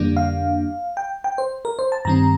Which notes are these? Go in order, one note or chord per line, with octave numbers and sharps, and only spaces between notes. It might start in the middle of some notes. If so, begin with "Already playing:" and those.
Already playing: F2 D3 G3 A#3 D4
F5
G5
G5
C5
A#4
C5
A5
G2 D#3 G3 C4 A#5